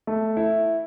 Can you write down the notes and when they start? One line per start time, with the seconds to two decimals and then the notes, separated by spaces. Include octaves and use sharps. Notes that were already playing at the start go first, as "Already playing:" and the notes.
0.07 A3
0.37 E4